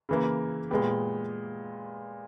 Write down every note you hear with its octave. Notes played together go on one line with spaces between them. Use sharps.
C#3 E3 A#3
A#2 G#3 B3 G4